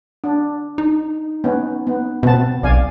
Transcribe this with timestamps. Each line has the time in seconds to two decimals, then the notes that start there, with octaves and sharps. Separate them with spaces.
0.24 D4
0.78 D#4
1.44 B3 C#4
1.87 B3
2.23 B2 B3 C4 A5
2.63 B1 D5 F5 G#5